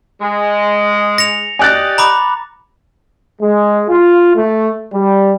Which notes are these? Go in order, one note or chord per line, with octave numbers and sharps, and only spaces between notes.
G#3
A#6 C#7 F7
G4 D5 D#5 G#5 F#6 A6
A#5 B5 D6
G#3
F4
A3
G3